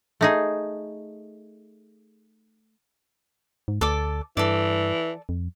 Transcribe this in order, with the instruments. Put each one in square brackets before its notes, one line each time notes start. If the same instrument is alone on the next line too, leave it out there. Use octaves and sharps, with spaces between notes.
[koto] A3 D#4 G#4
[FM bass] G#2
[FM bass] D2 [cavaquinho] A4 D5 D6
[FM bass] G2 [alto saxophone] E3 [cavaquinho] A4 D5
[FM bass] F2